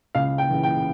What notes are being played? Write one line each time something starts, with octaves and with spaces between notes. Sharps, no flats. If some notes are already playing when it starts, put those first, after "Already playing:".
C#2 F5
G5
C#3 E3
G5